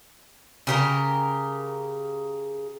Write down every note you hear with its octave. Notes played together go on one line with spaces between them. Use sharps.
C#3 G4 A#4